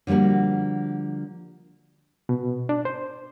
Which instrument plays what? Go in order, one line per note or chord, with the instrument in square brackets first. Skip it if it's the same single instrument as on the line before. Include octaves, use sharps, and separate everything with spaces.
[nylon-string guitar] D3 F3 G3 A#3 F#4
[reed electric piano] B2
D4
C5